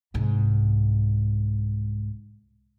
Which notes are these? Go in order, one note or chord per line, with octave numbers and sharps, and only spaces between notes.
C2 G#2